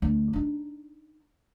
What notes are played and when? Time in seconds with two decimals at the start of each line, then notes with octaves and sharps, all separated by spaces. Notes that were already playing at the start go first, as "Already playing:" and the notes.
0.02 D2
0.33 D4 D#4